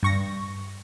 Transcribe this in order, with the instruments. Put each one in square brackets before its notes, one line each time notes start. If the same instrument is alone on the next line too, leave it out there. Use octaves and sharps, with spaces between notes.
[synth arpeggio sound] G2 C#6 A#6